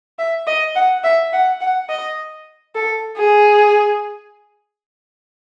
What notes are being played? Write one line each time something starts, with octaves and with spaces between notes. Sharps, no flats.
E5
D#5
F#5
E5
F#5
F#5
D#5
A4
G#4